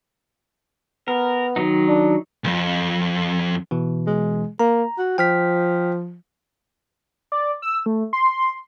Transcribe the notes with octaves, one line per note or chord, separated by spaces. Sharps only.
B3 A#4
D#3 F#3 D#4
D4
C2 F2
B2 E3
G#3
A#3 A#5
F#4
F3 G5 F6 B6
D5
E6
A3
C6